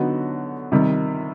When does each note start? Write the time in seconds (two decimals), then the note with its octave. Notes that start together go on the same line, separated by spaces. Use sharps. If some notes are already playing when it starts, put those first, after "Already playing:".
Already playing: D3 F#3 B3 D#4 F#4
0.72 C3 D#3 G3